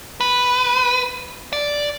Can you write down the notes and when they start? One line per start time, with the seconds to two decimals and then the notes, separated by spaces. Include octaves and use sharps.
0.21 B4
1.53 D5